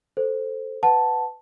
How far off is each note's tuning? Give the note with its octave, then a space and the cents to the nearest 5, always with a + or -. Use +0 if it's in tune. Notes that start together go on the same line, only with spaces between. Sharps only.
A4 +0 C5 +0
B4 +15 F#5 +0 A5 +0